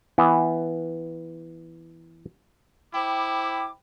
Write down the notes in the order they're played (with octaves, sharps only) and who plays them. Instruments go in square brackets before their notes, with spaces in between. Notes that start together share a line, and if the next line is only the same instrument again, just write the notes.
[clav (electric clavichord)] E3 B3
[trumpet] E4 [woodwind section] C5 B5 D6 [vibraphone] G5